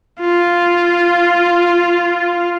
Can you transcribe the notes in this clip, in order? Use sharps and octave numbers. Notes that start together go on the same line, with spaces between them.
F4